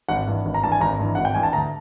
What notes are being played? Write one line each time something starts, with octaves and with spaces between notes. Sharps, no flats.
G#1 F#5
G2 E3
G#1
A#5
G2 E3 A5
G#5
G#1 A#5
G2 E3
G#1 F#5
G5
G2 E3 G#5
A5
D2 A#5